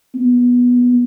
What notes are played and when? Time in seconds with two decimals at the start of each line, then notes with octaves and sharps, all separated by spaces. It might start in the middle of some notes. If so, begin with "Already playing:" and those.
0.15 B3